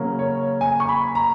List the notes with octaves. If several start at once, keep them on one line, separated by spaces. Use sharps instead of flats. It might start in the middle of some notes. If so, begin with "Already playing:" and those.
Already playing: C#3 F#3 A#3 C#4
C#5
G#5
C#6
B5
A#5